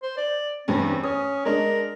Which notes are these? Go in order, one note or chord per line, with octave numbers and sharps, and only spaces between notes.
C5
D5
E2 G2 C4 C#4
C#4 D#6
G#3 D4 A#4